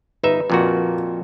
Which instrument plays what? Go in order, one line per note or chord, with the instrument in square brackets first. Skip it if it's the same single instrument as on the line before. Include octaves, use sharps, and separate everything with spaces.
[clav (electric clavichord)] G1 D#4 E5 [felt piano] B4
[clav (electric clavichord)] F2 A#2 F#4